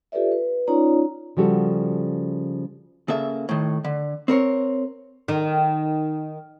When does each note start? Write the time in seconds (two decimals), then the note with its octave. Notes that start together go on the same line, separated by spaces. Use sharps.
0.12 F4 G4 A4 B4 D5 E5
0.32 B4
0.68 C#4 D#4 F4 C#5 D5 A#5
1.37 C#3 F3 G3 F#4 A4
3.08 C#3 A#3 A4 E5
3.49 A2 D#3
3.84 D3
4.28 C4 A#4 C#5
5.28 D#3